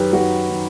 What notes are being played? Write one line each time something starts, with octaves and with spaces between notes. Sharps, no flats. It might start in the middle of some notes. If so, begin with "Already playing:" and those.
Already playing: F#2 D#3 G4 B4
F#2 F#4
D#3